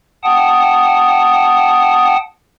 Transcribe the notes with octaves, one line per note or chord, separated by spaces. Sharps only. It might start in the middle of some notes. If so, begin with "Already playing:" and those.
F#5 G5 A5 D#6